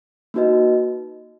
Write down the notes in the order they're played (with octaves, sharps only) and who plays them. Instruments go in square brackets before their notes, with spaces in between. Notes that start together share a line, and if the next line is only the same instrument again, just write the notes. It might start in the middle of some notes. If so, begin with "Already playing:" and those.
[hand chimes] A#3 D#4 F#4 B4 D#5